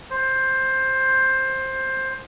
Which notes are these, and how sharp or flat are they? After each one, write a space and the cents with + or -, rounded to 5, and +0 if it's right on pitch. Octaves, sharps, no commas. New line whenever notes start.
C5 +15